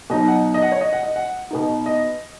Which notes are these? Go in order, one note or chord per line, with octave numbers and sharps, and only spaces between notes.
B2 F#3 D#4 D#5
F#5
D#5
F#5
C#5
D#5
F#5
D#5
F#5
B2 B3 D#4
D#5